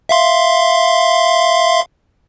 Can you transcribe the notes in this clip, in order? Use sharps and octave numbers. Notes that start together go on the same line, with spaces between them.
E5 F5 C6